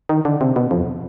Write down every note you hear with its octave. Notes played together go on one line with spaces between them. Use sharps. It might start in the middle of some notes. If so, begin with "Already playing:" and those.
D#3
D3
C3
B2
F2